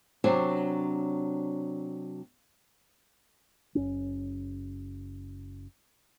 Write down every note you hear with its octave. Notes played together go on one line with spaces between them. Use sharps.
C3 F#3 D4 C5 C#5 G#5
F#1 C#4